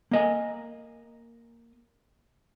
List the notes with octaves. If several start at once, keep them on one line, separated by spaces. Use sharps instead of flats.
A#3 D#5 G#5